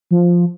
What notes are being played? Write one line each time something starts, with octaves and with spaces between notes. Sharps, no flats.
F3